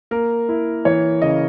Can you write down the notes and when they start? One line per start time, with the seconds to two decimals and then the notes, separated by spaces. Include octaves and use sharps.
0.11 A#3 A#4
0.49 E4
0.85 E3 C#5
1.22 C#3 D#5